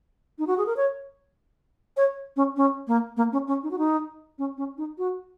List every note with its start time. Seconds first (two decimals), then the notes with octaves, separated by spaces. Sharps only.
0.39 D#4
0.47 F#4
0.58 G#4
0.66 A#4
0.77 C#5
1.97 C#5
2.36 C#4
2.57 C#4
2.87 A#3
3.17 A#3
3.32 C#4
3.47 C#4
3.63 D#4
3.71 F#4
3.78 D#4
4.38 C#4
4.57 C#4
4.77 D#4
4.98 F#4